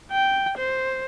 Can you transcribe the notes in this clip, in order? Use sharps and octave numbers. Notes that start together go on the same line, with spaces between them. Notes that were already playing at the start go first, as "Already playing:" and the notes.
G5
C5